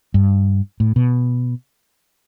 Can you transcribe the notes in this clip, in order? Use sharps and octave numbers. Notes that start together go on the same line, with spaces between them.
G2
A2
B2